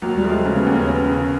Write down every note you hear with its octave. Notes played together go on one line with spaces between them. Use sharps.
D#2 F#3
G3
F3 A3
G#3
C#3 C#4
B3
D#2 C#4
C#4
B3 C#4
C#3